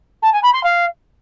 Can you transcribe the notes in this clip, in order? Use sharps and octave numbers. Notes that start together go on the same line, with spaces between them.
A5
G#5
B5
C6
F5